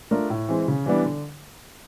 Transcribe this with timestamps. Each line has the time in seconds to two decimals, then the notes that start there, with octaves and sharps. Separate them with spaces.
0.11 A3 D4 F4 A#4
0.30 A2
0.49 E3 G#3 C4
0.68 C#3
0.86 E3 G3 B3 D4
1.05 D3